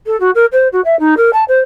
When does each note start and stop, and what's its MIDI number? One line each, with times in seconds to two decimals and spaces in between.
0.06 0.19 69
0.20 0.31 66
0.35 0.46 70
0.52 0.68 72
0.73 0.81 66
0.85 0.98 76
1.00 1.15 63
1.17 1.31 70
1.33 1.44 81
1.48 1.60 72